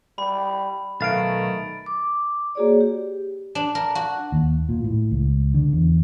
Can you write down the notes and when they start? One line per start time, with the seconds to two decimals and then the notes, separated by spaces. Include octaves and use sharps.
0.18 G3 B5
1.01 B1 D#3 A3 F5 A6 D7
1.86 D6
2.55 A#3 F#4 G#4 C#5 D5
2.81 G4
3.55 D4
3.75 A#4
3.95 F#4
4.32 D#2
4.69 A#2
4.84 A2
5.11 C#2
5.54 D3
5.73 E2